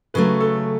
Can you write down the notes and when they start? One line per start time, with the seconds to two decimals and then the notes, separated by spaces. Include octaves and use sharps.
0.14 C#3 F#3 A3 B4
0.41 A4